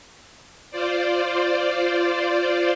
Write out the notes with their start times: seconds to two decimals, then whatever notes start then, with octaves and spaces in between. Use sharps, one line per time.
0.71 F4 C5 D5